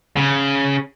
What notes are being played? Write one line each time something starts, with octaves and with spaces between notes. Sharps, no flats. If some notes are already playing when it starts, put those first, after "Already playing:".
C#3